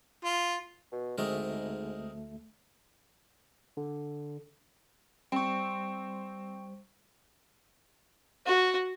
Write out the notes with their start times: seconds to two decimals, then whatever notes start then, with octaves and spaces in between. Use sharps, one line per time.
0.25 F4
0.92 B2
1.18 D2 G#2 G#3 A3 C4 A#4
3.77 D3
5.32 G3 C4 C5 G5 C#6
8.46 F#4